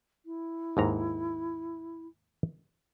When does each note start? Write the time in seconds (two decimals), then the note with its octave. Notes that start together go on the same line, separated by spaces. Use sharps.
0.26 E4
0.77 D#2 G#2 A#5